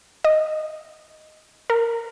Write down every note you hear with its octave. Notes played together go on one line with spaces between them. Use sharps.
D#5
A#4